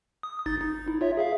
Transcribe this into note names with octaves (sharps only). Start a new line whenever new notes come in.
D#6
G1 D#4 A6
D#4
E4
F4 C#5 E5
G#4 E5 F5